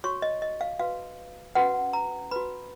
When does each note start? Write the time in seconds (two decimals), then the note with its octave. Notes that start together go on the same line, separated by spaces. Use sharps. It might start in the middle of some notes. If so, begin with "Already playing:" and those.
0.04 F#4 C#5 C#6
0.22 D#5
0.42 D#5
0.61 F5
0.79 F#4 B4 F5
1.55 C#4 F#4 B4 F#5
1.93 A#5
2.31 F#4 B4 B5